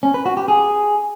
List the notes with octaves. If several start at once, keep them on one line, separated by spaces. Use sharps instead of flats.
C#4
B4
F#4
G4
G#4